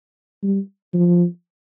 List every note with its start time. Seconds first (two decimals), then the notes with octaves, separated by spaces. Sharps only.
0.43 G3
0.94 F3